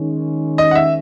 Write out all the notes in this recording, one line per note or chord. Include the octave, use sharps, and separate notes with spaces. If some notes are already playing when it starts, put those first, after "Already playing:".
Already playing: D#3 G#3 C#4
D#5
F#5
E5